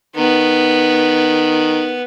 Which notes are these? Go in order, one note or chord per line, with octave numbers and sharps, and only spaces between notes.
D#3 B3